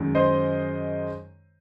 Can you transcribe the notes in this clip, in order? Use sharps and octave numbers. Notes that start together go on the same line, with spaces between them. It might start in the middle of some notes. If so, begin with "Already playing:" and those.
Already playing: F#2 D#3 G#3
C5 D#5